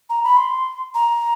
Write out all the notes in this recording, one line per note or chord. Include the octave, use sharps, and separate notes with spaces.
A#5
B5
C6
A#5